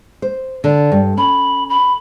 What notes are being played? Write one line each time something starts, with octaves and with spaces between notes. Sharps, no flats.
C5
D3 D5
G2
C#4 B5
B5